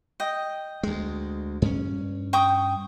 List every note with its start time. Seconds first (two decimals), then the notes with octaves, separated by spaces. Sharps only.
0.20 D#5 G5
0.83 D2 G#3
1.62 G2 C#4
2.33 G5 C#6 D#6